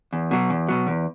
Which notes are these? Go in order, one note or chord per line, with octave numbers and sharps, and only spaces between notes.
E2
B2 F#3
E2
B2 F#3
E2